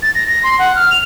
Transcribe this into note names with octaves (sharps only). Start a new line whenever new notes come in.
A6
A#6
A#6
C6
F#5
F6
F7